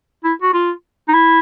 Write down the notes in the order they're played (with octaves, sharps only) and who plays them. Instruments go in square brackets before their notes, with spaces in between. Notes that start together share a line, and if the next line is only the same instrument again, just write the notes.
[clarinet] E4
F#4
F4
D#4
E4